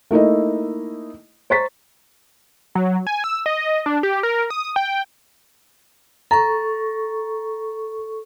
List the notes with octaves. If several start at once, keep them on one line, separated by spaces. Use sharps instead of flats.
A3 A#3 D#4 E4 D#5
C5 A#5 C#6 A6 B6
F#3
G#5
E6
D#5
D4
G4
A#4
D#6
G5
A4 A#5 C#6